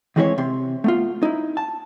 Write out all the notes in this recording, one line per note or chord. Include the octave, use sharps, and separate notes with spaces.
D#3 E3 G#3 C4 E4 C#5
C3 C6
A3 B3 F4
D#4 E4
A5